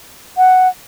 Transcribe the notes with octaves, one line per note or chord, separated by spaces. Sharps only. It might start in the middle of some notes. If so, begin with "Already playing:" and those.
F#5